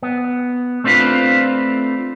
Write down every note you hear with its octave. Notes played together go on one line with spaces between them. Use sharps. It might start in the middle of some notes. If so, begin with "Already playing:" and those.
B3
A3 C4 D4 F4 B4